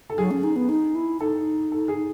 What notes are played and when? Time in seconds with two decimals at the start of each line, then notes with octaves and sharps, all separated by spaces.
0.10 A4
0.18 F#3 G#4
0.31 C#4
0.44 D#4
0.56 B3
0.69 D#4
0.95 E4
1.20 D#4 A4
1.72 A4
1.88 G#4